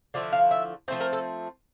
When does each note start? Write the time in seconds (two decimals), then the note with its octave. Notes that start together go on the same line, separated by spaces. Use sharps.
0.14 D3 F3 A3 E4 D5
0.32 F5
0.51 E5
0.88 F3 A3 C4 C5
1.00 A#4
1.13 A4